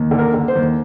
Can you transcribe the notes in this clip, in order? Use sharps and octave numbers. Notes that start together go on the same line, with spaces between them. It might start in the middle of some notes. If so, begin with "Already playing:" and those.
Already playing: D#2
D3
A#4
D3
C5
D#2